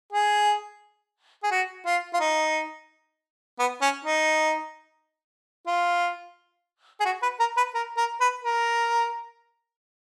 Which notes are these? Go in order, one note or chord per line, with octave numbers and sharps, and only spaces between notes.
G#4
G#4
F#4
F4
F4
D#4
B3
C#4
D#4
F4
G#4
F#4
B4
A#4
B4
A#4
A#4
B4
A#4